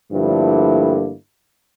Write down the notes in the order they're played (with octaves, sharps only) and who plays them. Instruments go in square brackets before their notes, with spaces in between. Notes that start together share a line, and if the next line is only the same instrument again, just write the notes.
[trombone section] G2 D3 F3 A3 A#3 E4